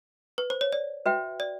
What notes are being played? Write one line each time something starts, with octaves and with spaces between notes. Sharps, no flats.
B4
C5
C#5
D5
F#4 B4 E5 G5
D5